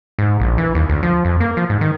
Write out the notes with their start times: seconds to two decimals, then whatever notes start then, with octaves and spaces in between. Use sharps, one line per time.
0.19 G#2
0.40 A#1
0.58 E3
0.75 D#2
0.89 D2
1.03 F3
1.25 F2
1.40 A#3
1.57 F3
1.69 G#2
1.81 D#3